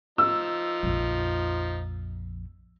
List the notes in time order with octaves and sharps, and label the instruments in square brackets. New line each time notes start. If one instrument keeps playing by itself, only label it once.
[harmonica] F3 D#4 [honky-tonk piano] E6
[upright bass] A#1 F2